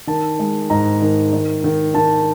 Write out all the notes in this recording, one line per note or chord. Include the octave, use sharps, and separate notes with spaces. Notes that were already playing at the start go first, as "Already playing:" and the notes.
D#3 A5
G#3
G#2 A#5
D#3
D#3
D#3
D#3 A5